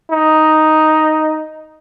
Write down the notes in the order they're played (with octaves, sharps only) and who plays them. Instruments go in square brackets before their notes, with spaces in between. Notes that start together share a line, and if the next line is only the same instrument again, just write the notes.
[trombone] D#4